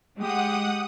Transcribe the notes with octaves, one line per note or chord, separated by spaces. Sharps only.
G#3 G4 F#5 G5 D#6